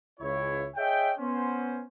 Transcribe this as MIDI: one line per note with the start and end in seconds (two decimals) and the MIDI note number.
0.20 0.67 37
0.20 0.67 64
0.20 0.67 73
0.76 1.11 68
0.76 1.11 73
0.76 1.11 75
0.76 1.11 76
0.76 1.11 79
1.19 1.82 59
1.19 1.82 61
1.19 1.82 72